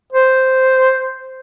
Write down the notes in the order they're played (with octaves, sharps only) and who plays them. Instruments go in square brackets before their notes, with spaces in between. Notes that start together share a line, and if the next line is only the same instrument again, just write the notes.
[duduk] C5